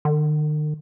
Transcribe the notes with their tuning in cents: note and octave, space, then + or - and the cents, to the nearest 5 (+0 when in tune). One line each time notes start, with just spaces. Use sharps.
D#3 -45